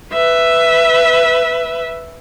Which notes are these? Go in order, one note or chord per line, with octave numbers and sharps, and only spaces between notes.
B4 E5